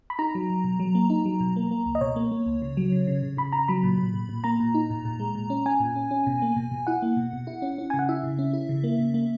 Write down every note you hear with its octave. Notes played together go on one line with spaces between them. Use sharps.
B5
D#4 A#5
F#3
F#3
B2
F#3
A#3
D#4
F#3
B2
A#3
A#3
C#2
D#5
B2 C#5
A#3
A#3
C#2
C#3
F#3
C#3
C#3
C#3
C#3 B5
C#3 A#5
F#3 B5
A#2
A#2
A#2
A#2
A#3 A#5
A#2
D#4
A#2
A#2
G#3
A#2
C#4
C#4 G#5
A#2
C#4
C#4
B2
A#3
B2
B2
E4 F#5
A#3
B2
B2
E4
C#4
C#4
C#3 G#5
F#5
E4 E5
C#3
C#4
E4
C#3
A#3
C#3
A#3